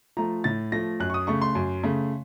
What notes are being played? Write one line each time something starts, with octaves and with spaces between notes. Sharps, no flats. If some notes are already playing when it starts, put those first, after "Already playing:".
F3 A3 A#5
A2 A6
F3 A3 A#6
F#2 F#6
C#6
D#6
C#3 A3 C#6
C6
F#2
C#3 A3